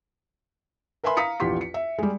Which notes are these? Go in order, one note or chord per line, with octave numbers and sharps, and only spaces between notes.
A#4 B4 E5 G#5 B5 C6
F5 A#5 D#6 B6 C#7
A#1 E2 F4 G4 C6 B6
C#7
E5
G3 G#3